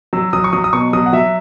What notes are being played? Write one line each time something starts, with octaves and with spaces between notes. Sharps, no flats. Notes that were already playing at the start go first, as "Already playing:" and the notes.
F#3 E6
F#3 D#6
C#6
F#3 D#6
D#6
B2 C#6
F#3 D#6
F#5
F#3 E5